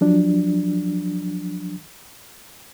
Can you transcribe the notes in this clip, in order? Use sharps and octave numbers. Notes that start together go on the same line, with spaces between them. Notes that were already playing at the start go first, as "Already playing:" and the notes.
F3 F#3 D4